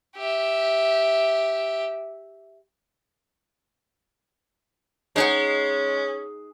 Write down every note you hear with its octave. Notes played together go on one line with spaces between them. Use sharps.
G4 E5
G#3 C#4 D#4 G#4 F#5